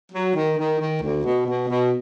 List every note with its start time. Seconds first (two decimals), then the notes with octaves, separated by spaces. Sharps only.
0.12 F#3
0.35 D#3
0.57 D#3
0.80 D#3
1.02 D2
1.24 B2
1.47 B2
1.68 B2